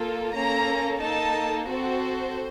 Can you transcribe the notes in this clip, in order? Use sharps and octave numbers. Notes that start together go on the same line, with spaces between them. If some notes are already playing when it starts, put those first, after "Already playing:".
Already playing: A#3 F4 A4
A#3 C#4 A4 A#5
A#3 D#4 A4 A5
C4 F#4 A4 C5